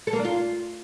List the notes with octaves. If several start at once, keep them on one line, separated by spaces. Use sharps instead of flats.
A4
A#3
D4
F4